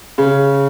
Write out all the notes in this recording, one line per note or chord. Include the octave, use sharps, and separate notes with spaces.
C#3